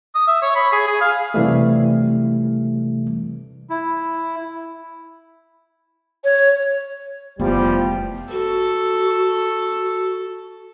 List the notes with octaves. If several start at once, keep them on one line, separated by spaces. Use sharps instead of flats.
D#6
E5
C#5
B5
G#4
G#4
F5
C3 E3 G3 A3
E4
C#5
F1 E2 F3 G3 B3
F#4 A4